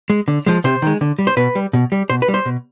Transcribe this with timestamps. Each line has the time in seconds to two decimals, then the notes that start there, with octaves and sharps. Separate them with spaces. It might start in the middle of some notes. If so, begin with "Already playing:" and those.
0.10 G#3
0.28 D3
0.46 F3 G#3
0.64 C3 C5
0.82 D#3 G#3
1.01 D3
1.19 G3
1.27 C5
1.37 B2 B4
1.55 G3
1.73 B2
1.92 G3
2.10 B2 C5
2.22 B4
2.28 G3
2.34 C5
2.46 B2